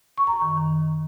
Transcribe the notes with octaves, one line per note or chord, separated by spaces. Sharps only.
C#6
F#2 A#5
D#3
D#3